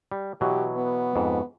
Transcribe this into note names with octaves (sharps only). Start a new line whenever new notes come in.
G3
B2 E3 F#3 G4
B3
F2 G#2